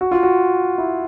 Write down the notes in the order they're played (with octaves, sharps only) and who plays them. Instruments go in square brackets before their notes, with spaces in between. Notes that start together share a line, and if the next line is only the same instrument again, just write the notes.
[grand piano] F#4
F4
F#4
E4